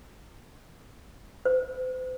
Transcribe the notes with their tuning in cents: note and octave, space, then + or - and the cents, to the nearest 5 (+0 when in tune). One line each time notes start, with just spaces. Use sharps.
C5 -40